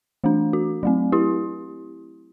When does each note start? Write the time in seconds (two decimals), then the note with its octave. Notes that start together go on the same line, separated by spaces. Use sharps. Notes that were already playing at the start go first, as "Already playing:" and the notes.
0.24 E3 A3 D4
0.53 F#4
0.83 F#3 A3 C4
1.12 E4 G4